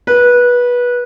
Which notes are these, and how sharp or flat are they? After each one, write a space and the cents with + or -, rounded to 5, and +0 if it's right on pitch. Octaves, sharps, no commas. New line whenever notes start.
B4 -20